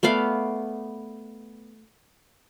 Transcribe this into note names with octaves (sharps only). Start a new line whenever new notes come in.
A3 B3 D5 F5